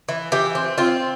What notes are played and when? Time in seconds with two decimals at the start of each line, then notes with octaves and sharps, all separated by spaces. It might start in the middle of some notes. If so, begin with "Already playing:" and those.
0.09 E3
0.32 E3 G4
0.55 C4
0.78 C4 F4